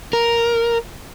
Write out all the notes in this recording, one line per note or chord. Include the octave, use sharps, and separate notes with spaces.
A#4